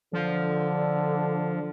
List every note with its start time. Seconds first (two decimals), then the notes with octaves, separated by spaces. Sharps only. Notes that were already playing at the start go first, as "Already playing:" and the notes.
0.13 D3 F3